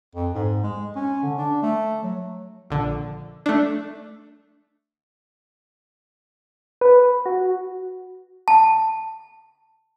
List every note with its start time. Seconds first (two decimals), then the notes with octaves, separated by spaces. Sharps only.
0.15 F2
0.35 G#2
0.64 G#3
0.96 C#4
1.23 D3
1.38 D4
1.63 A3
2.03 F#3
2.70 A#1 D3
3.46 A3 D4
6.81 B4
7.26 F#4
8.48 A5